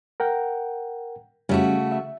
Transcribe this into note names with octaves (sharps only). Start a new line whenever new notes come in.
A#4 F#5 G5
C#3 G3 A3 C#4 F#4
E5